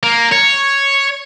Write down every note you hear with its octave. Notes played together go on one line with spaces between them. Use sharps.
A#3
C#5